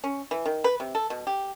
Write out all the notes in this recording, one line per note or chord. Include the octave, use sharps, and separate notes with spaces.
C#4
E3
D#3
B4
C3
A4
B2
G4